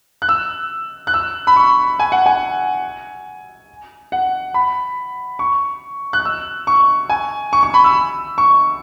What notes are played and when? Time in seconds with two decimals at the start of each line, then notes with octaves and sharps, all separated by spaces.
0.22 F#6
0.29 E6
1.07 F#6
1.14 E6
1.47 B5
1.56 C#6
2.00 G#5
2.12 F#5
2.26 G#5
4.12 F#5
4.54 B5
5.39 C#6
6.13 F#6
6.25 E6
6.67 C#6
7.10 G#5
7.53 C#6
7.63 C#6
7.74 B5
7.84 E6
8.38 C#6